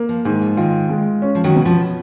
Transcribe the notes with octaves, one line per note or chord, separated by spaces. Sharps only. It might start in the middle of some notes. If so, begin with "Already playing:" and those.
Already playing: A#3
F3
G#2 D#3
F3
D#3 F4
G#3
C#4
F3
D#3 F#3
B2
F3